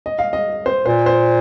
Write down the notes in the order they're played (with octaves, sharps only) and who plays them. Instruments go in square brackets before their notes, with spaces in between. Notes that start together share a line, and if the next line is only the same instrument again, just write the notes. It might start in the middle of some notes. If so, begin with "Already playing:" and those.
[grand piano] D#5
F5
D#5
C5
[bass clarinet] A#2 [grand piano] C5
[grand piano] C5